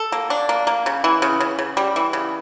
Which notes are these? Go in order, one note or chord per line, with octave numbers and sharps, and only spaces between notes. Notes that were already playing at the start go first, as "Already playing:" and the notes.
Already playing: A4
A#3
D4
A#3
A#3
C#3
E3
C#3
C#3
C#3
G3
E3
C#3